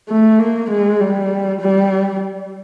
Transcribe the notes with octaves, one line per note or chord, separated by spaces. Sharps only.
A3
A#3
G#3
G3
G3